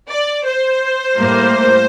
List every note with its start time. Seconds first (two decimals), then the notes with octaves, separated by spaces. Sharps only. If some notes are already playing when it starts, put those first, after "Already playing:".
0.10 D5
0.46 C5
1.18 A2 G3 A#3